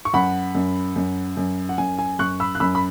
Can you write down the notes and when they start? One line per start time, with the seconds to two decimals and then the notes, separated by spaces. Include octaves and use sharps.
0.05 C#6
0.14 F#2 F#5 B5
0.55 F#2
0.96 F#2
1.37 F#2
1.69 F#5
1.78 F#2 G#5
1.99 G#5
2.19 F#2 C#6 F#6
2.40 B5 E6
2.55 F#6
2.60 F#2 B5 E6
2.75 B5